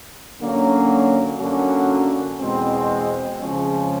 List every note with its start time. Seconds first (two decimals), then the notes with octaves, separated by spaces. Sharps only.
0.39 D3 F#3 A#3 C#4
1.39 F#2 D3 F#3 A#3 C#4
2.40 E2 B2 G#3 C4
3.40 F2 C#3 F3 G#3 C#4